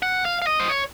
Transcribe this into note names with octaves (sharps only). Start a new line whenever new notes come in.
F#5
F5
F5
D#5
C5
C#5